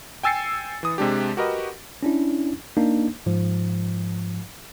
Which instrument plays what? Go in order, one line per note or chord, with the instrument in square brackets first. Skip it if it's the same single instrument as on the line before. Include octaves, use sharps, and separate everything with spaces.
[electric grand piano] G5 G#5 E6 A6 C7 C#7
E3 D#6
C3 G#3 D4 G4
F#4 G4 A#4 B4 D#5
[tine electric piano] C#4 D4 E4
A#3 D4 D#4
G#2 F3